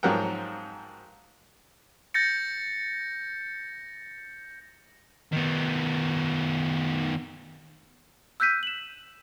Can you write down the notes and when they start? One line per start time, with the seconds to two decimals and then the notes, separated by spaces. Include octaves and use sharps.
0.03 G#2 F3 F#3 A#4 F#5 G5
2.14 G6 A6 A#6 C#7
5.32 D#3 B3
8.40 E6 F#6 G6 B6 D#7
8.63 E7 F#7